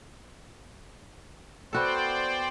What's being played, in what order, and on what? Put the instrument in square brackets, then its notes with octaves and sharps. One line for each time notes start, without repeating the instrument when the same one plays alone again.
[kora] B3 F#4 A4 [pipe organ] C5 D5 G5